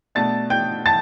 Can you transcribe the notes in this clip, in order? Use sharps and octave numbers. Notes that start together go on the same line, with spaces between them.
B2 A3 D4 A5 A6
G5 G6
A5 A6